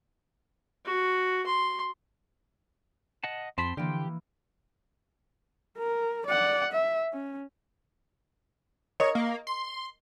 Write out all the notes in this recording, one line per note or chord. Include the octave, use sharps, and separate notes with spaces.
F#4
C6
D#5 F#5 A5
F2 C4 A5 B5 C6
D3 E3 A#3 G4 G5
A#4
D5 F#5
E5
C#4
A#4 C#5 D#5 C#6
A#3
C6